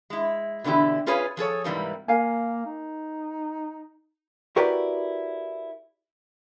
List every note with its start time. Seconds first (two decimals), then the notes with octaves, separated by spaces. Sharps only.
0.10 G#3 E4
0.64 B2 D3 E3 E4 G4
1.06 C#4 F4 G#4 B4 C#5 F5
1.37 F3 G#4 A4 C#5
1.64 G#2 C3 E3 G3 A#3
2.08 A#3 A#4 F5 G#5
2.66 D#4
4.56 E4 F#4 G4 A#4 B4 D5